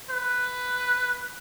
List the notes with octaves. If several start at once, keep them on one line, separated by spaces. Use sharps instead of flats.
B4